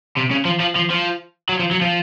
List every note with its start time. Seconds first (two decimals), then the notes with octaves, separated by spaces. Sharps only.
0.17 C3
0.31 C#3
0.45 F3
0.60 F3
0.76 F3
0.90 F3
1.49 F#3
1.59 F3
1.71 F#3
1.81 F3